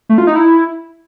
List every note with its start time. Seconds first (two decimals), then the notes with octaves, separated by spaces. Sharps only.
0.09 A3
0.18 F4
0.27 D#4
0.36 E4